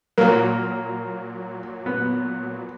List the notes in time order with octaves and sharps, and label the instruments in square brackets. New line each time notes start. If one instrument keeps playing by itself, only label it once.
[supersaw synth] A#2 F#3 [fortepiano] A#3
[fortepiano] B3